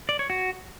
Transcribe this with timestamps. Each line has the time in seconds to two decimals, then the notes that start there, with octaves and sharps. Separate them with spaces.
0.09 D5
0.19 C#5
0.30 F#4